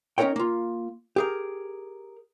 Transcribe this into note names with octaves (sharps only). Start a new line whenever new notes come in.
C#4 D#4 G4 A#4 C#5 G5
A#3 F4
G4 G#4 A#4